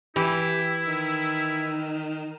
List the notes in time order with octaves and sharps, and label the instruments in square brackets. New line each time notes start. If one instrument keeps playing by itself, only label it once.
[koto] E3 [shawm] E4 [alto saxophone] G4
[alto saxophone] D#3